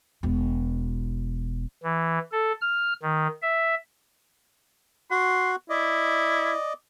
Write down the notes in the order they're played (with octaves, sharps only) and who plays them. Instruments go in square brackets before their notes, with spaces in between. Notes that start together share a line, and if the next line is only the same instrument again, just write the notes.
[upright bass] E1 B2
[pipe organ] E3
A4
F6
D#3
E5
[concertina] F#4 F#5 [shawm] C6
[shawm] E4 [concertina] D5 D#5